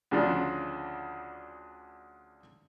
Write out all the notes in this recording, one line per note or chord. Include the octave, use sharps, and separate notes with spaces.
D2 C#3 F3 D4